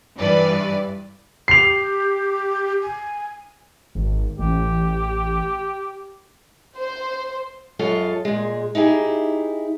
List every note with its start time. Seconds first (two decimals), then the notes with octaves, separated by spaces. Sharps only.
0.18 G2 E3 B4 D5
1.48 G4 C7 F7
2.82 G#5
3.95 G#1
4.39 A1 G4
6.77 C5
7.79 F#2 F#3 G#3 F4 A4 F5
8.25 A#2 G#3
8.75 D#4 E4 G4 G#4